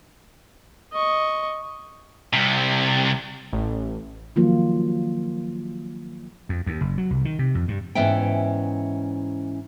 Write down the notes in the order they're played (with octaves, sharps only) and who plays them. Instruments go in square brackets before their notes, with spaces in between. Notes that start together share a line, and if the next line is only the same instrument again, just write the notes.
[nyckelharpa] D#5 C#6
[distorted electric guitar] C2 C3
[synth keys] A1
[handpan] D#3 F3 F#3 A#3 F4
[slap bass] F2
D#2
F#1
F#3
C2
D#3
C3
F2
G2
[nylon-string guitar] G#2 E3 B3 C#4 E5 G5